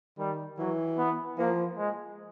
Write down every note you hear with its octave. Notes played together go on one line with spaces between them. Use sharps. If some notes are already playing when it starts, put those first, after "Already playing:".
D#3 G3
E3 F#3
B3
F3 A#3
G#3